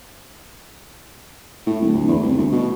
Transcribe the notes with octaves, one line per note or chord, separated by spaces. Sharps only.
A2
D1
D2
E2
C2
D2
B2